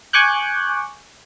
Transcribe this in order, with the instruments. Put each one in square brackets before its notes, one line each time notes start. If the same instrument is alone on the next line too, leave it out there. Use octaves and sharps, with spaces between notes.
[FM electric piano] G#5 C#6 D6 F#6 G6